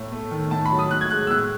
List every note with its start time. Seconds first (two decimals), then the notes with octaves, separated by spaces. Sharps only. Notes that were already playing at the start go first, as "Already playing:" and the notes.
Already playing: A2
0.12 A3
0.31 D#3
0.51 A2 A5
0.65 B5
0.71 F#3
0.79 D#6
0.91 A2 F#6
1.01 G#6
1.10 G#3 F#6
1.27 E6
1.30 A2 F#6